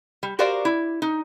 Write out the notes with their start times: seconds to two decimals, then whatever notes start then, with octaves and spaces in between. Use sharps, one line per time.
0.23 G3
0.39 F#4 G4 A#4 C5 D5 F5
0.65 E4
1.02 D#4